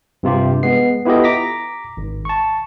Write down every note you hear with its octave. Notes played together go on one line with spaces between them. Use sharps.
G2 C3 F4 G4
G#3 B3 C7
B3 E4 F4 G4 A4 D#5
A#5 D6 A#6 B6
G#1
A5 C#6